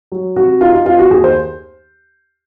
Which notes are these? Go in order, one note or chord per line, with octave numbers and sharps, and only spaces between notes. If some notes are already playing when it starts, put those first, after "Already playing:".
F#3
C3 F#4
D#4 F4
F4
C4 F4
F#4
D#2 G#4
C5